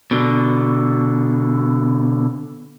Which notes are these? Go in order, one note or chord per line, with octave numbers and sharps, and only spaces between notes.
B2 D3